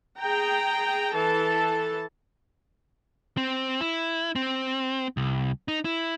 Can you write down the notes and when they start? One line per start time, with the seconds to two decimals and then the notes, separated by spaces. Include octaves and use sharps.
0.19 G#4 G5 A#5
1.14 E3 A4 A5
3.37 C4
3.81 E4
4.36 C4
5.17 C2
5.68 D#4
5.85 E4